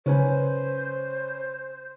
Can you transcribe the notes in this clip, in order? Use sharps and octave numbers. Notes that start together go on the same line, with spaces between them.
C#3 C#4 B4 C5 G#5